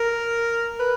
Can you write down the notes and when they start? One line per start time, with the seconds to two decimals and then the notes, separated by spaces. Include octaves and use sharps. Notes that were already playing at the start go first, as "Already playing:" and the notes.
Already playing: A#4
0.80 B4